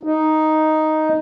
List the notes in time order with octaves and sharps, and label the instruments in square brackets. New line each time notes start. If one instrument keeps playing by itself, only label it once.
[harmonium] D#4